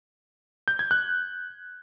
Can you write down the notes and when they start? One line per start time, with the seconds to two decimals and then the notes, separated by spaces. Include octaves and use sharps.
0.68 G6
0.79 G#6
0.91 F#6